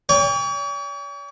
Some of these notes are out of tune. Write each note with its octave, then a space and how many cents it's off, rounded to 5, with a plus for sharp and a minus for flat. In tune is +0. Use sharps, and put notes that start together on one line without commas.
C#5 +45 G5 +40